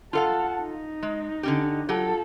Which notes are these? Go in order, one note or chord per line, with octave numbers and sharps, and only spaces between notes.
F4 A4 F5 F#5 A5
D#4
G#3
D3 C#4 G4
F#3 F4 G4 A4